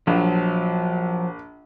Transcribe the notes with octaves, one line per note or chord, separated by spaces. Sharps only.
A#1 F3 F#3